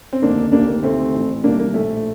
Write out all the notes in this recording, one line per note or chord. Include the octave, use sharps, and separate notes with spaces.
C4
F1 D#2 D3 A#3 D4
D2 C3 D#3 A#3 D4
A#3
D2 C3 D#3 A3 C4
A1 A2
C2 C3 D#3 A#3 D4
A#3
A#1 A2 A3